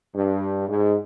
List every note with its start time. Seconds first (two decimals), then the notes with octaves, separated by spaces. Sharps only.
0.15 G2
0.69 G#2